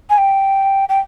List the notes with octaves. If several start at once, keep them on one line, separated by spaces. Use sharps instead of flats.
G#5
G5
G5